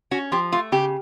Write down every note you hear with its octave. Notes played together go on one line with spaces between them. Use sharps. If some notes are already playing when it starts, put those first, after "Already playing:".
C#4 F#4
F3 G4
A3 F4
C#3 G4